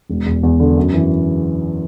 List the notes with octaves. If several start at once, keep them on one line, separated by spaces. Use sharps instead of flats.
E1
E2
E2
D3
F#2
E3